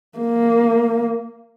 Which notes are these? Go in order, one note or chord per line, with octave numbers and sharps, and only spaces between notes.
A#3